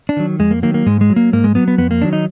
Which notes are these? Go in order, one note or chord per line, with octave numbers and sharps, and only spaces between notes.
D4
D#3 F#3
F2 G#3
A#3
D#3 F#3 A#3
A#3
G#2 G#3
G#3
F#3
A#3
G#2 A#3
G#3
F#3 B3
B3
F2 B3
A#3
D#3 F#3 D4
D#4